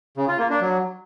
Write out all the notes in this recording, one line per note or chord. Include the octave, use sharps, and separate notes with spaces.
C#3
F4
A#3
D4
F#3